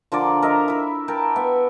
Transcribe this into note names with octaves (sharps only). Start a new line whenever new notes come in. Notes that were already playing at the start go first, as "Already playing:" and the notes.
D3 F3 A#4 D5
A#4 D#5 E5
E4 B5
A#4 G5 A5
B3 E5